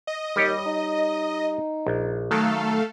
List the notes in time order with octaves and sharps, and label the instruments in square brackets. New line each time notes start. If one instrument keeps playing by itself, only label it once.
[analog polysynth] D#5
[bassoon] D#2 [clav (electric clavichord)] G3 G4 C#5
[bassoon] D#4
[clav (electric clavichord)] A#1
[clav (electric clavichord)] D#3 F#3 [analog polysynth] A3 A4 F5